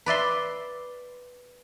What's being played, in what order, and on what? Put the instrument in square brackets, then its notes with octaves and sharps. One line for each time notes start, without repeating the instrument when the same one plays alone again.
[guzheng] B4 D5 E5 C6